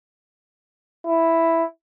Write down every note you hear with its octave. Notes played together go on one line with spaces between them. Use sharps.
E4